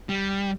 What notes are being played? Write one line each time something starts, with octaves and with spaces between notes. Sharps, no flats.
G3